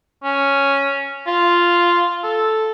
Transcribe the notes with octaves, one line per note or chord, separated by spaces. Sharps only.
C#4
F4
A4